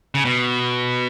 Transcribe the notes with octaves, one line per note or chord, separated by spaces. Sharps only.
C#3
B2